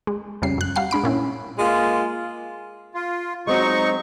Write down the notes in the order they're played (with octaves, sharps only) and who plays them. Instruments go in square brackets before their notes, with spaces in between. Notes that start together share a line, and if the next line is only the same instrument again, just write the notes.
[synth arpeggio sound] G#3
F2 C#3 G3 C7
F#2 F#6
G3 F5 F#5 C7
G#3 D4 B5 D7
A#2 C#4 E4
[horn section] G#3 A#3 F4
[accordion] F4
[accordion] F#3 D#4 C#6 [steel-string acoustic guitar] G#3 C4 F#4